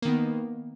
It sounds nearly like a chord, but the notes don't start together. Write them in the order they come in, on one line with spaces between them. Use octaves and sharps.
A#3 D#3 B3